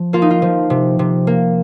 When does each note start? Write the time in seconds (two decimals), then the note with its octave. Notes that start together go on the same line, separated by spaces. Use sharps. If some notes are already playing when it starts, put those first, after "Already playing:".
Already playing: F3
0.13 A#3 F4
0.22 D#4
0.30 F4
0.42 F3
0.70 C3
0.99 C3
1.27 A#3